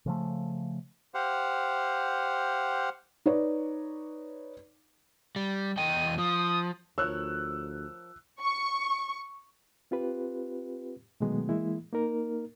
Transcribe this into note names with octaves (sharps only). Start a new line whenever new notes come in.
C#3 F3 A3
G4 C5 F5 F#5
D#4 B4 C#5 D5
G3
E2 D#5 G5 D#7
F3 D#6
D2 F3 A#4 C#5 E6 F#6
C#6
C4 F4 G4 B4
B2 D#3 F#3 G#3 A3 B3
E3 G#3 A#3 E4
A#3 D#4 A#4